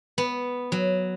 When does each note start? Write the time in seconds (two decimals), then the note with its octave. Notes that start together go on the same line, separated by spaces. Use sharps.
0.18 B3
0.72 F#3